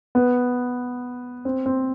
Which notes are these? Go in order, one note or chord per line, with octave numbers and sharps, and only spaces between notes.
B3
C4
C4